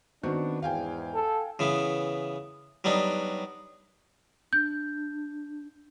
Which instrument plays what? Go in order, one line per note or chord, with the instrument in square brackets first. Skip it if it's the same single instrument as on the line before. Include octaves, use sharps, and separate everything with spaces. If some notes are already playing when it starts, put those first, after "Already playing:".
[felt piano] D#3 C4 F#4 [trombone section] B3 D4
[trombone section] E2 G#2 [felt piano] F5 G5 G#5
[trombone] A4
[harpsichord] C#3 E3 B3
F#3 G3 B3 D4 D#4
[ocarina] D4 [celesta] G6